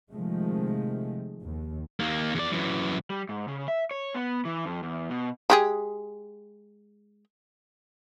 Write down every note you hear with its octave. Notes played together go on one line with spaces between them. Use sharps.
C3 D#3 F3 G#3 A3
D#2
D#2 A#3
E2 D5
F#2 E3
G3
G#2
C#3
E5
C#5
B3
E3
F2
E2
B2
G#3 G4 G#4